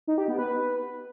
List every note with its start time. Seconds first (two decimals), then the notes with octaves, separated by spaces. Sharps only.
0.07 D#4
0.18 G4
0.28 B3
0.39 B4